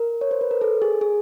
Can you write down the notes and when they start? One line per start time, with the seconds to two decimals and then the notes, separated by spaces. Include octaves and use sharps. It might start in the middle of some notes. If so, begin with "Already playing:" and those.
Already playing: A#4
0.21 C#5
0.31 C5
0.41 B4
0.51 A#4
0.61 A4
0.82 G#4
1.01 G#4